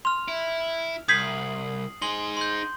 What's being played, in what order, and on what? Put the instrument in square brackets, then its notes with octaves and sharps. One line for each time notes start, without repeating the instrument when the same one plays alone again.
[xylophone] C6 [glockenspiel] F6 F7
[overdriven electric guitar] E4
[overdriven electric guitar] C2 [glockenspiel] D#6 C7 F#7 [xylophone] G6 G#6 B6
[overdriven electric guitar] D#4 G#4 [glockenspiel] C6 G7
[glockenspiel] C6 G6